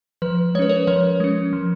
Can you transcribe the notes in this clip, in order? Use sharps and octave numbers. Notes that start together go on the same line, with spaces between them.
F3 B4
G#3 C#4 B4 C#5
A#4 C#5
F3 A#4 C#5
G#3 C#4
F3